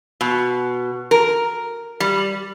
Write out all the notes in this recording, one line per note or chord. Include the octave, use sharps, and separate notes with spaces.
B2
A#4
G3